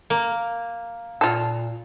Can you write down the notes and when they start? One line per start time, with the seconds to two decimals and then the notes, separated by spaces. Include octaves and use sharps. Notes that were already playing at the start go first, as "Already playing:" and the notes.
0.10 A#3
1.21 A#2 F4 A4